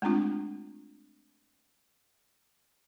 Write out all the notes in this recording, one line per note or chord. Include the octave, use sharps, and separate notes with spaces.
G#3 A3 C4 D4 F4